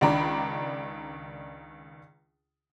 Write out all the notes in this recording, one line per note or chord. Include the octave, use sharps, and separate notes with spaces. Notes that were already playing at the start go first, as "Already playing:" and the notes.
C#2 D#3 D4 A#5 B5